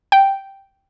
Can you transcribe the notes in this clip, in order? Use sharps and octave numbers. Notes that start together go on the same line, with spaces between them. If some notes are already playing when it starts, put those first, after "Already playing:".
G5